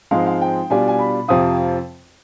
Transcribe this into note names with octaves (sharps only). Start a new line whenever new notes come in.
G#2 F3 G#3 C4 D#4 F5
F5
G5
B2 G3 D4 F4 G#5
G#5
B5
F2 C3 F3 C4 F4 D#6